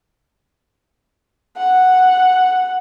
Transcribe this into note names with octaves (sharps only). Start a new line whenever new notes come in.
F#5